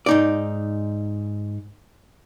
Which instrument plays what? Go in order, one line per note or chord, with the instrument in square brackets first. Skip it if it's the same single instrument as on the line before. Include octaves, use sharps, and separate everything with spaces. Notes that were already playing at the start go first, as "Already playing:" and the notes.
[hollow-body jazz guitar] G#2 D#4 D5